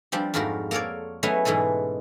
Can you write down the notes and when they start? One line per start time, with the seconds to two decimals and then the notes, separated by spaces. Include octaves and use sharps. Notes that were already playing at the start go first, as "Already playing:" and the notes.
0.12 F3 G3 C4 D4
0.34 F2 G#2 G3 F4 F#4 A#4
0.71 A#3 A4 A#4 C#5 D5
1.23 F#3 G#3 A3 B3 C#4 E4
1.45 G#2 B2 E3 G#3 A4